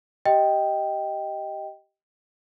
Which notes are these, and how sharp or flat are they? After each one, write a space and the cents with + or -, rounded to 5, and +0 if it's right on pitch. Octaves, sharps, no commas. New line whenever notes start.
G4 -10 D#5 +5 G5 +0